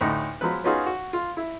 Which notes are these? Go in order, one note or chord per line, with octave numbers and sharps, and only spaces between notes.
D2 A2 D#4
F3 F#3 G#3 B3 B4
B3 C#4 D#4 F4 F#4 G#4
F#4
F4
E4